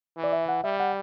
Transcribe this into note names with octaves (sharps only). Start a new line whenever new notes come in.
E3
D5
E5
F#5
G3 E5
F#5